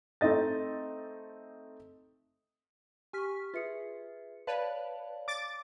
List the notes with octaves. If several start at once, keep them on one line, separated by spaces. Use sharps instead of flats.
A3 C4 D#4 D#5 A6
G4 G#5 C#6 F6 B6
F4 G#4 B4 E5 C#7
B4 C#5 D5 F5 A5
D6 A6